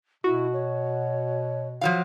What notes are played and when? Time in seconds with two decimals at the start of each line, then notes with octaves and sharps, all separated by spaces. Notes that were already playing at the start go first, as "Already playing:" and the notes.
0.24 B2 E4 F#4
0.53 C#5
1.81 F3 F#3 F5